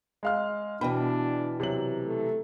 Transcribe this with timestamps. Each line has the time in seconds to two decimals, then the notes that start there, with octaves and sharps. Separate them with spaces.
0.23 G#3 F5 F6
0.81 B2 E3 D4 G5 B5
1.60 C3 F#3 F#7
2.05 A3